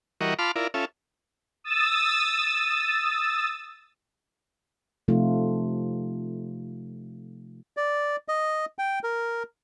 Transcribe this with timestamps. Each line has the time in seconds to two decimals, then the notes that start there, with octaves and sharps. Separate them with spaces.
0.21 E3 G3 F#4 A#4 D#5 C#6
0.39 F4 A5 B5 C6 D6 F6
0.56 E4 F4 A#4 D5
0.74 C#4 F4 A4 E5
1.64 D#6 E6 A6
5.08 C3 F3 A3 D#4 F4
7.77 D5
8.28 D#5
8.78 G5
9.03 A#4